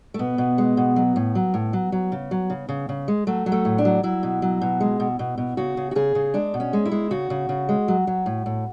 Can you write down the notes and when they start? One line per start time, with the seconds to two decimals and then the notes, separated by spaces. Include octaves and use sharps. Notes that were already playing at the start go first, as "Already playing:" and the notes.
0.14 A3
0.19 B2 B3
0.38 B2
0.58 G#3
0.77 B2
0.96 F#3
1.16 A2
1.35 F#3
1.54 A2
1.73 F#3
1.92 F#3
2.12 C#3
2.31 F#3
2.50 C#3
2.69 C#3
2.89 C#3
3.08 G#3
3.27 F#3 A3
3.46 F#3
3.52 A3
3.65 A2
3.78 D4
3.85 F#3
4.03 F#3 E4
4.23 B2
4.42 F#3
4.61 B2
4.80 G#3
5.00 B2
5.19 B2
5.38 B2
5.57 C#3 F#4
5.77 C#3
5.91 F#4
5.95 C#3 G#4
6.15 C#3
6.34 G#3 D4
6.54 B2
6.60 C#4
6.73 G#3
6.86 E4
6.92 G#3
7.11 C#3 F#4
7.30 C#3
7.49 C#3
7.69 G#3
7.88 F#3
8.07 F#3
8.26 A2
8.46 A2